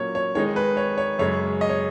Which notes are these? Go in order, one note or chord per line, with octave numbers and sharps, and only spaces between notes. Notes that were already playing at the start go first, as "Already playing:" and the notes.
Already playing: A#2 F#3 A#3 C#4 C#5
C#5
D#3 G#3 D#4 C#5
B4
C#5
C#5
F#2 C#3 G#3 C#5
D#5
C#5